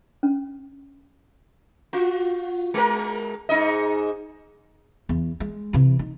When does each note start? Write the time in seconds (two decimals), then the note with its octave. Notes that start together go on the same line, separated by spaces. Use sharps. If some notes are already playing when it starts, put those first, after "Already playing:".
0.23 C#4
1.93 F4 F#4
2.74 G#3 A#4
3.49 G#2 D#4 D#5
5.09 E2
5.40 G#3
5.73 C3 E3
5.99 D#4